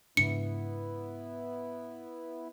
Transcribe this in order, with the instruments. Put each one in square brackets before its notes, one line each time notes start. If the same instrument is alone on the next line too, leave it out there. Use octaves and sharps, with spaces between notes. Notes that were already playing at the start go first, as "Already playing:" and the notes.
[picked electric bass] G#2 C#3 D4 [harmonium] B3 E4 [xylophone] C#7